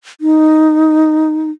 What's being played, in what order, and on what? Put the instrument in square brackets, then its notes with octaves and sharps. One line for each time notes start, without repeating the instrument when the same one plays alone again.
[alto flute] D#4